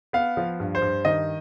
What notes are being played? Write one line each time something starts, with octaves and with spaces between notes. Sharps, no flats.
B3 F5
F3
G2
C5
G2
D#3 D#5